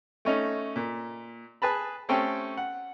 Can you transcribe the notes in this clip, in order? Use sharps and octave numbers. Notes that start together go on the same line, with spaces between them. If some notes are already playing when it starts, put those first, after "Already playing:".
A3 C#4 D#4
A#2
G#4 B4 A5 B5
A3 C4 C#4 G4 A4 G5
F#5